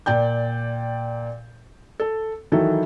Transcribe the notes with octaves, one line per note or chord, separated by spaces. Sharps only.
A#2 D5 G5 G6
A4
D#3 E3 F#3 D#4 E4 A4